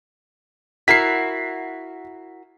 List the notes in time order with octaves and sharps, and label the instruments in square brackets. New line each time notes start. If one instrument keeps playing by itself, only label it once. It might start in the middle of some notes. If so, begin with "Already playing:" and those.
[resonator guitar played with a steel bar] E4 F#4 A#4 [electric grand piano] B6 C7